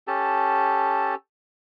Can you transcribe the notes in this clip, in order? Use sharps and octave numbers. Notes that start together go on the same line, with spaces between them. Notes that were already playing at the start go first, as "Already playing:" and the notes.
C#4 G4 A4 A5